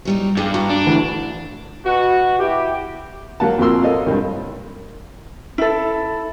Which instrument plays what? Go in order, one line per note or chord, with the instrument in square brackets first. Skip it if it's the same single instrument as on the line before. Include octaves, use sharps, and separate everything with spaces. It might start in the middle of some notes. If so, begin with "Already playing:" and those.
[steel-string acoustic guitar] F#3 G3 D#4
[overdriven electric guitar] G2 [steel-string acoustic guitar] D4 G#4
[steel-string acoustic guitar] F#4 A#5
[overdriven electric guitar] D4
[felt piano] D2 D3 E3
[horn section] B2 F#4
E4 G4
[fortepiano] F#3 A#3 F#5 A5
F2 A#2 F#4 A#4 C6 E6
A#3 A4 C#5 D#5
C2 G2
[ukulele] E4 A4